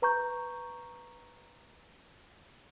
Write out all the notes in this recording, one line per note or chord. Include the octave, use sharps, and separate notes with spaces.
B4 A#5 C#6 G6